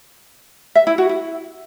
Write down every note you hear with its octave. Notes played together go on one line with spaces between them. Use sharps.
E5
E4
F#4
E4